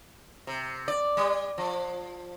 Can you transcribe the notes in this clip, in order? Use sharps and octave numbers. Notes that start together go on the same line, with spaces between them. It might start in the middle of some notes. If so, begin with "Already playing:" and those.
C3
D5
G3
F3